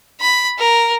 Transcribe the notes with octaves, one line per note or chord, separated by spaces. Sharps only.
B5
A#4